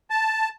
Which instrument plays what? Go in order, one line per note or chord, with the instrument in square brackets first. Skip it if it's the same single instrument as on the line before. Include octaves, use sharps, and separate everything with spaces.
[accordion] A5